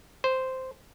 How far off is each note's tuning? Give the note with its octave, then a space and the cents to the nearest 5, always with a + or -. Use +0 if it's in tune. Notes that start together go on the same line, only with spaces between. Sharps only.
C5 -5